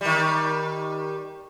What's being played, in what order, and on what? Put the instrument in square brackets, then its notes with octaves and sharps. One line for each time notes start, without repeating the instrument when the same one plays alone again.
[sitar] D#3 G3